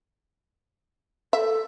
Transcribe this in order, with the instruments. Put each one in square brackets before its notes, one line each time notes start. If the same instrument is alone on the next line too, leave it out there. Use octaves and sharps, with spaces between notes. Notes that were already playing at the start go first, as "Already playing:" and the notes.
[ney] A4 [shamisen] E5